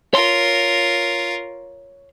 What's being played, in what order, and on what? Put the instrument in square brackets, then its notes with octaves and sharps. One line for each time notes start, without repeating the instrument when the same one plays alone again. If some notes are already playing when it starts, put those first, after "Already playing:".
[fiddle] F4 A#4 [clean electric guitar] C#5 C6